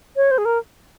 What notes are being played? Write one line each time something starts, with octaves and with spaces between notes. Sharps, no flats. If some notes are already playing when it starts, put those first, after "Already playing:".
C#5
C5
G#4
A#4